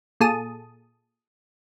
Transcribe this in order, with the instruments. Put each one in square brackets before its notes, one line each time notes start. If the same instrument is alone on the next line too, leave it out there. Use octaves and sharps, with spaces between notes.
[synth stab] A#2 G#4 A4 A5 D#6